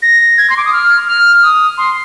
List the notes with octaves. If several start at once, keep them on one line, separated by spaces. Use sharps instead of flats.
A#6
G#6
C6
D6
D#6
F6
F6
D#6
C6